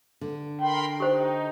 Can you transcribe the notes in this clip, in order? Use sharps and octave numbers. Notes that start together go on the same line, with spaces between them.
D3
A#4 G5 B5 C6
D#4 G4 C5